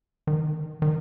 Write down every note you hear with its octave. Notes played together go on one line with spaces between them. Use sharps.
D#3
D#3